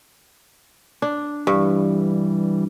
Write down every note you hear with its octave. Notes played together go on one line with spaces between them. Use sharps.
D4
G2 E3 G3